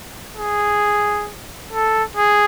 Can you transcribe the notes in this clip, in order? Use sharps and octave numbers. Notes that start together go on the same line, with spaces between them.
G#4
A4
G#4